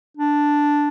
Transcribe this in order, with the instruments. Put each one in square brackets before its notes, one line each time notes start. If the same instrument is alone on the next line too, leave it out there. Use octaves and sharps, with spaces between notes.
[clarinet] D4